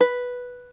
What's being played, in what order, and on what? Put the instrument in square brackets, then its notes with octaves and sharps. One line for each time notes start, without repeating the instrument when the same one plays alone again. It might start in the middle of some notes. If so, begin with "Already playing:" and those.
[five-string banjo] B4